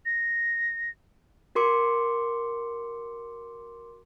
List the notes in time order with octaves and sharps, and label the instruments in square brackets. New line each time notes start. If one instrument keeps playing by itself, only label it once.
[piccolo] A#6
[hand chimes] F#4 A#4 C6 D6 C#7